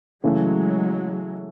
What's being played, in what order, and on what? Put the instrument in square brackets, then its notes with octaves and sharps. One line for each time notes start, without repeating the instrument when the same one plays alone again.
[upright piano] C#3 E3 A3 [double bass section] F#3 G#3